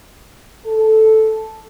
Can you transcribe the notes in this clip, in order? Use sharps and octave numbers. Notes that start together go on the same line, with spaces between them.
A4